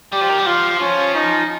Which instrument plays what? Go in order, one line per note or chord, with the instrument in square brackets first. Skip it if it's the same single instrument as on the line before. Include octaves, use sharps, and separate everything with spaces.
[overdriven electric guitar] G3 [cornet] G4
[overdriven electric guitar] F3
D#3
G3
[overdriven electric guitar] F3 [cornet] F4
[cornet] C#4
D#4